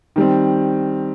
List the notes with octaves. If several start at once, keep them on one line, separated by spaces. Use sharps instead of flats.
D#3 G3 C4